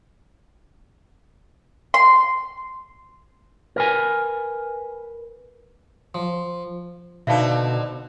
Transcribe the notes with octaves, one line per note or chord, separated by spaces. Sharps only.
C6
A#4 B4 G#5
F3
B2 D3 C4 D#4 E5 F5 A5